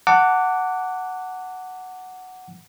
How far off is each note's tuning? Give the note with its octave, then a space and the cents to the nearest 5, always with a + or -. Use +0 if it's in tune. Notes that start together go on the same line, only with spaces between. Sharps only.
F#5 +0 A5 +35 D6 -15